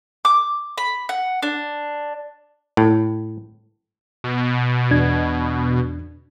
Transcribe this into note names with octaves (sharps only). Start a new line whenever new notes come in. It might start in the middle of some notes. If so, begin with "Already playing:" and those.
D6
B5
F#5
D4
A2
B2
E2 D4 G#6